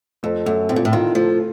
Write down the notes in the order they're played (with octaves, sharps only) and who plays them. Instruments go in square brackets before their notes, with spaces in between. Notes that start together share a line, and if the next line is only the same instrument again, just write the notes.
[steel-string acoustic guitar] F2 [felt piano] A3
[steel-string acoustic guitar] F#2 [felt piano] A3
[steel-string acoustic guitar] A2 [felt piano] C4
[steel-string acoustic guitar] A#2
A2
[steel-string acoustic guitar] D#3 [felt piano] F4
[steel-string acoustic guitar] F3 [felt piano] A3